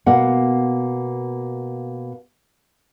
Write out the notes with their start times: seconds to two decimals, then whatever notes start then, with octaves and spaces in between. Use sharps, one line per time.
0.06 B2 A#3 F#5